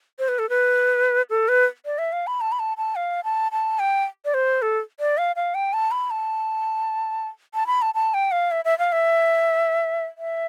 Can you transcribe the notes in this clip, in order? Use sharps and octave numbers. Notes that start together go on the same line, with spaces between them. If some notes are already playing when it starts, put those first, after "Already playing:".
C5
B4
A4
B4
A4
B4
D5
E5
F5
B5
A5
B5
A5
A5
F5
A5
A5
G5
D5
C5
A4
D5
F5
F5
G5
A5
B5
A5
A5
B5
A5
A5
G5
F5
E5
E5
F5
E5
E5